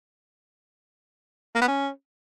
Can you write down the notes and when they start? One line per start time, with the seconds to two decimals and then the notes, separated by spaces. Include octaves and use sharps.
1.55 A#3
1.61 B3
1.68 C#4